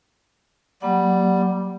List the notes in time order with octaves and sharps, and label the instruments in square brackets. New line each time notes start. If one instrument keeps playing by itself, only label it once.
[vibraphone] F#3 A#3 F#5 [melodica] G3